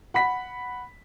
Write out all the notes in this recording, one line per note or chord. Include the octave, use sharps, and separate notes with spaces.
F#5 B5 B6